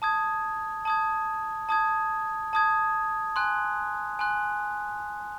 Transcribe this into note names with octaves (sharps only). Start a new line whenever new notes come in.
A5 D#6 G#6
A5 D#6 G#6
A5 D#6 G#6
A5 D#6 G#6
G#5 C6 F#6
G#5 C6 F#6